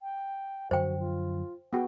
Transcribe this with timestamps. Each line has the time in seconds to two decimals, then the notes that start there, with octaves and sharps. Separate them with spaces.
0.01 G5
0.71 F#2 D3 F3 F#4 C5 G5
0.99 F4
1.73 B3 F#4 G#4 G5